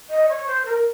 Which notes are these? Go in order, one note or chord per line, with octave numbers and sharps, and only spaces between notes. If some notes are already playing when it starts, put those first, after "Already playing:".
D#5
C#5
C5
A#4